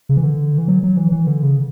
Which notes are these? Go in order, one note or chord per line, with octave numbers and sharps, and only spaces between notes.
C#3
E3
D3
E3
F#3
F#3
E3
E3
D3
C#3